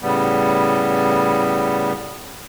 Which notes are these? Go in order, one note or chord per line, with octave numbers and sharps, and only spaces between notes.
A2 C#3 G3 B3